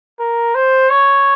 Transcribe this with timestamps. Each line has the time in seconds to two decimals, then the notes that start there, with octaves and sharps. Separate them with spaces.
0.20 A#4
0.55 C5
0.90 C#5